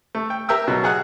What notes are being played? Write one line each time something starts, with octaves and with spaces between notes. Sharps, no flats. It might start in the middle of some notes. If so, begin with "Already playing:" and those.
A3
G5
G4 A#4 E5 G5 E6
B2 F#3
G#4 F#5 F#6